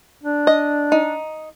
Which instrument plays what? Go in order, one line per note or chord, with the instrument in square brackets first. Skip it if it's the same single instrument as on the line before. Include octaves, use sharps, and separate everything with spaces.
[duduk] D4
[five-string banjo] D#5
D#4